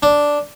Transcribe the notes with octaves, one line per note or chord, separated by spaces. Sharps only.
D4